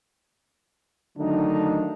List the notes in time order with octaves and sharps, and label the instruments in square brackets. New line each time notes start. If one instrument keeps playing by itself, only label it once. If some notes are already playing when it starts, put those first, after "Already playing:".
[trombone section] D3 D#3 F#3 A3 D4 D#4